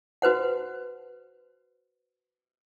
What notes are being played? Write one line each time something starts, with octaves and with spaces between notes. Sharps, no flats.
F#4 B4 C5 F#5